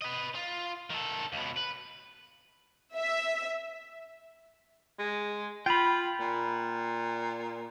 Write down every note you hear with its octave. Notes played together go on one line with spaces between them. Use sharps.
B4 D#5
F4
D#3 A4
C#2 B2
B4
E5
G#3
F4 G5 B5
A#2